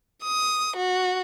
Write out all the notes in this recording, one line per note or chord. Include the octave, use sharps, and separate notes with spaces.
D#6
F#4